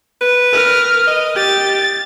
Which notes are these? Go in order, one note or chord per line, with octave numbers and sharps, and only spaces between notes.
B4
A#4 F6
D#5
G4 A6